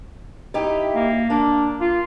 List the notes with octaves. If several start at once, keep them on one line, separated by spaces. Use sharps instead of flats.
D#4 E4 G4
A#3
A#3 D4
F4